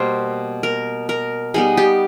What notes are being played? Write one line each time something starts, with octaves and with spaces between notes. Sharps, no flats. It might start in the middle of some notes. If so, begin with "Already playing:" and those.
Already playing: B2 G3 A#3 C5
A#4
A#4
G3 B3 D#4 G#4
G4